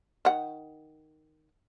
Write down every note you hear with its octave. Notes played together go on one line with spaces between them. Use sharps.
D#3 F#5